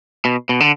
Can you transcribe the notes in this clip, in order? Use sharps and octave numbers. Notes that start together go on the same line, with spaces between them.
B2
B2
D3